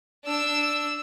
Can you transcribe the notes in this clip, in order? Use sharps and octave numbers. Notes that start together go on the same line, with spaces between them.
D4 E6